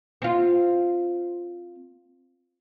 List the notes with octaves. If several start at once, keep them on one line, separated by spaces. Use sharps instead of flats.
C4 F4